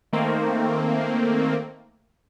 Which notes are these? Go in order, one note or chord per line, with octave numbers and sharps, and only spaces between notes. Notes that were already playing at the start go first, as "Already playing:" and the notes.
D#3 A3 A#3 C4